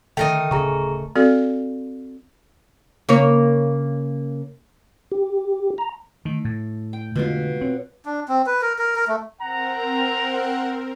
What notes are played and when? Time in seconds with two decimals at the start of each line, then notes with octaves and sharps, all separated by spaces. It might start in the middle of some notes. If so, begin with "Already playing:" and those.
0.17 D3 D#3 A3 A#4 D#5 G5
0.51 D1 C#3 G#4 A#5 C#6
1.16 C4 F#4 A4 D5 F5
3.09 C#3 A#3 C#5
5.12 G4
5.78 A#5
6.25 D#3 A3
6.45 A2
6.93 G5
7.16 B2 D3 G#3 F4
7.61 C4 C#5
8.06 D4
8.28 C4
8.46 B4
8.62 A#4
8.79 A#4
8.96 A#4
9.08 A3
9.41 C4 A#4 F#5 A#5
10.33 F#5